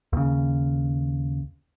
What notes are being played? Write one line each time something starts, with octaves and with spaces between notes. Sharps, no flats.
D#2 C#3